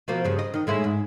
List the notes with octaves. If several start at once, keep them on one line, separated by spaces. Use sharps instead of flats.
B2 F3 A#3
G2 C#3
D#5
D#3 D#5
A2 G#3 E4
G#2